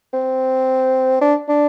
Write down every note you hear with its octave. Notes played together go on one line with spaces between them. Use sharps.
C4
D4
D4